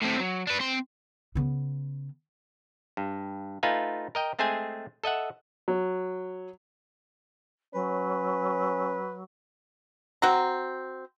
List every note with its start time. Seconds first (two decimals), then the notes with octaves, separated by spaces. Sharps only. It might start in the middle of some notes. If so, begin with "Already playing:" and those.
0.02 A2 C4
0.20 F#3
0.47 D4 B4
0.60 C4 C6
1.35 C#3 B3
2.97 G2
3.63 A3 D#4 F4 B4 F5 G#5
4.15 A#4 D#5 G5
4.39 G#3 A3 C4 G#4 C5 G#5
5.04 A4 D#5 E5 F#5
5.68 F#3
7.74 F#3 C#4 B4
10.22 C4 F#4 A#5